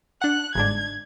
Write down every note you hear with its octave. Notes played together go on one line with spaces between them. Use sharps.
D4 F#5 F#6
G1 G#2 D4 G#6